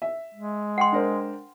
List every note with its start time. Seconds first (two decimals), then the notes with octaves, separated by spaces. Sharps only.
0.02 E5
0.34 G#3
0.78 F#5 G5 C6
0.92 D4 A#4 C5